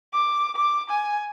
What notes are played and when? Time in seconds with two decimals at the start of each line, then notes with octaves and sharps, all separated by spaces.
0.13 D6
0.57 D6
0.90 G#5